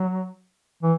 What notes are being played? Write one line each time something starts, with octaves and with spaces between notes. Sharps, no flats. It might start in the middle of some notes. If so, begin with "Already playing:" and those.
Already playing: F#3
E3